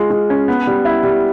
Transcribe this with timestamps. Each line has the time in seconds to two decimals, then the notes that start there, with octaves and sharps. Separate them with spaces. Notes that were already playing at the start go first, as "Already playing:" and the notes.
Already playing: G#3 F4
0.11 G#3
0.30 C#4
0.48 B3
0.67 G3
0.85 E4
1.04 G3